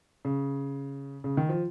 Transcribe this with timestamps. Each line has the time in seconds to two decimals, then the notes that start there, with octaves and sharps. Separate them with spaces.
0.25 C#3
1.24 C#3
1.37 D#3
1.49 F3